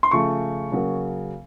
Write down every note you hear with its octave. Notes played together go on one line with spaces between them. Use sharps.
C6
C#3 F3 A3 C#6
C#3 F#3 A#3